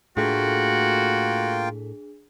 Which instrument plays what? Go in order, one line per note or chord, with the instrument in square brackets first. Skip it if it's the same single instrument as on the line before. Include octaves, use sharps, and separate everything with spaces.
[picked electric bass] A2 A3 [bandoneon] A#3 F4 G5 [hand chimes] D4 G#4 [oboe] F#4